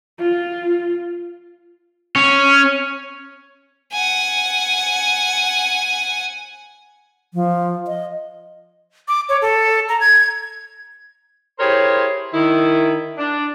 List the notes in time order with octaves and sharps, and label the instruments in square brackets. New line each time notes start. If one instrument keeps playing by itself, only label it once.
[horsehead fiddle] F4
[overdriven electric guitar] C#4
[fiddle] F#5 G#5
[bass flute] F3
D#5
[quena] D6
C#5
A4
A#5
G#6
[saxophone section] E4 G4 G#4 A#4 C5 C#5
D#3 E4
D4